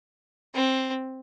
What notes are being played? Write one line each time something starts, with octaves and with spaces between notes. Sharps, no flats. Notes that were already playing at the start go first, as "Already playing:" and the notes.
C4